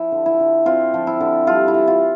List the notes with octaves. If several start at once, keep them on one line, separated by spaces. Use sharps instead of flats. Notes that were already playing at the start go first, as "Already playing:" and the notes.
Already playing: F3 E4
D3
E4
D3
C4 F4
F3
E4
D3
G3 F4
E4
E3
F4